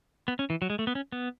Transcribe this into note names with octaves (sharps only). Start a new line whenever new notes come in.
B3
C#4
E3
F#3
G#3
A3
B3
C#4
B3